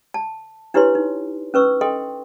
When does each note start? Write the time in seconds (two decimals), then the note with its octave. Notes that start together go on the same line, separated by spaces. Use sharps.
0.14 A5
0.74 D4 E4 G4 B4 C#5 C6
0.95 D#4
1.54 C#4 B4 C#6 E6
1.81 A4 D#5 G5 C6